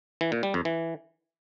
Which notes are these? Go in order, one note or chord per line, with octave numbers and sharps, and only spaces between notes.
E3
A#2
G3
F2
E3